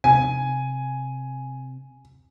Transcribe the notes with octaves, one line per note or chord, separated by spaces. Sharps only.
C3 G#5